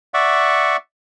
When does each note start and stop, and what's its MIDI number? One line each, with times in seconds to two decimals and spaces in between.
0.14 0.77 74
0.14 0.77 76
0.14 0.77 78
0.14 0.77 85